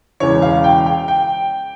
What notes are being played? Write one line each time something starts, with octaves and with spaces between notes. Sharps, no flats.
E1 E2 C#3 E3 C#5
F5
G5
G5
G5